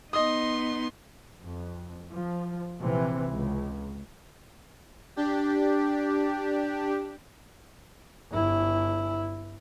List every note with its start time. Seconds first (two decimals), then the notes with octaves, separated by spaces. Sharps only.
0.13 B3 D#4 D#5 C6 D#6
1.40 F2
2.10 F3
2.81 A#1 C3 E3
3.30 C#2
5.16 D4 G4
8.30 G1 E4